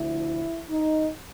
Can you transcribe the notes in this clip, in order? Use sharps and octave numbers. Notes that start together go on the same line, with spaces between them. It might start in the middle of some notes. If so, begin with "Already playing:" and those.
Already playing: D2 D3 F3 E4
D#4